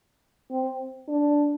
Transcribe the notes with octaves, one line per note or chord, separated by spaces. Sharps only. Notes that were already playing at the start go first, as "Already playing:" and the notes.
C4
D4